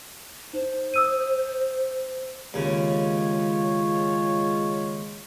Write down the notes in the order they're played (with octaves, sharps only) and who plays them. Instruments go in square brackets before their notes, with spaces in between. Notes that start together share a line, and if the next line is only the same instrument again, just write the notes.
[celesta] D#4 [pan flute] C5
[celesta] D#6 E6 D#7
[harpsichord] D#2 C#3 [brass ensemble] G#3 F4 C#5